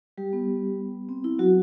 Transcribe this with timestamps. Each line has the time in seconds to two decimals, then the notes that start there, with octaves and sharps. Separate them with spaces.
0.18 G3 G4
0.33 B3
1.09 C4
1.24 E4
1.39 F#3 F#4